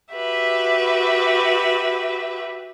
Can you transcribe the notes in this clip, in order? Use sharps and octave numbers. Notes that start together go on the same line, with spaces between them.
F#4 G4 B4 E5